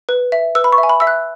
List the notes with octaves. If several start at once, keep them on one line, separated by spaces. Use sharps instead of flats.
B4
E5
B4 E6
B5
C#6
E5
G#5
B5
E5 E6
F#6